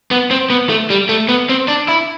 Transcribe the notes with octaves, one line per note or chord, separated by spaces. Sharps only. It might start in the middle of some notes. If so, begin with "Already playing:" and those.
B3
C4
B3
A3
G3
A3
B3
C4
D4
E4